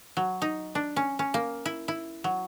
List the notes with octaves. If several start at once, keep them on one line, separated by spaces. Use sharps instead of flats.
F#3
D#4
D4
C#4
C#4
A#3
E4
E4
F#3